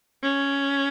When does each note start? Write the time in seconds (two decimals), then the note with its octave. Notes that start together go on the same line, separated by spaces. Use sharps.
0.23 C#4